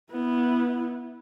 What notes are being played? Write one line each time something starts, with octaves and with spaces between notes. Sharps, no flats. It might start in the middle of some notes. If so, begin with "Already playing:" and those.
B3 E4